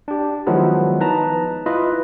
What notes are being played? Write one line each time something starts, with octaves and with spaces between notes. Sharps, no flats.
D4 G4
D#3 F3 F#3 G#3 B3 E4
D#4 B4 A5 A#5
E4 F4 B4 D#5